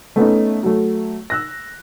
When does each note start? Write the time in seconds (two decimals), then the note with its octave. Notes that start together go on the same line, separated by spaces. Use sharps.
0.16 A3 B3 C#4 D#4
0.63 F#3 A3
1.30 E6 F#6 A#6